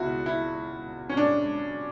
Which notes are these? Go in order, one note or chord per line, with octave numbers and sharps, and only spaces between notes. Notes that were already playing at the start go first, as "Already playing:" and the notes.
Already playing: C#2 B2 E4 F#4
E4
C#4
D4